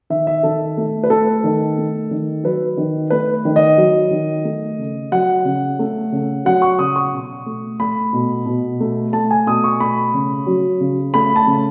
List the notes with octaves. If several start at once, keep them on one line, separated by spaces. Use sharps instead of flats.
D#3 E5
E5
D#3 A4
A3
B4
A3 A4
D#3
A3
D#3
F#3 B4
D#3
A3 B4
D#3
D#5
F#3
D#3
A3
C#3
F#3 F#5
C#3
A3
C#3
F#3 F#5
C#6
C#3 D#6
C#6
B2
A3
A3 B5
B2
B2
A3
A3 A5
G#5
B2 D#6
C#6
A3 B5
C#3
F#3
C#3
A3 B5
A5
C#3